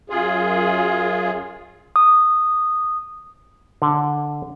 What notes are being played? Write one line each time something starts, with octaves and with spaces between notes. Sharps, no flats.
F#2 F4 G#4
D#6
D3